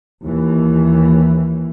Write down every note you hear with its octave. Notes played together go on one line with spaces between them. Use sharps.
D#2 E3